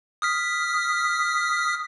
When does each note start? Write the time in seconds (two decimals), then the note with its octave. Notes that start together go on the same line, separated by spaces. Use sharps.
0.22 D#6 F6 B6